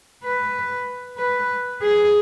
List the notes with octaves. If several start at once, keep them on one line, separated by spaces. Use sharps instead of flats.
B4
B4
G#4